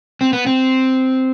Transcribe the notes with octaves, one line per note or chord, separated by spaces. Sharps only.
C4
B3
C4